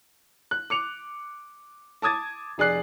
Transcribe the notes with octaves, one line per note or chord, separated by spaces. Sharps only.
F#6
D6 C#7 F7
A5 D6 D#6 G#6 A6
F1 G#4 D5 F#6 C7